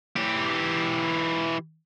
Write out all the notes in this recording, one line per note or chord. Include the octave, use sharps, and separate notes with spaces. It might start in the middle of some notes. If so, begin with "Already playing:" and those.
E3 G4